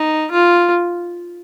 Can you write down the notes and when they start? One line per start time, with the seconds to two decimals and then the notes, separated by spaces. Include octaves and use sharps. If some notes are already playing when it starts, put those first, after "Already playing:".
Already playing: D#4
0.32 F4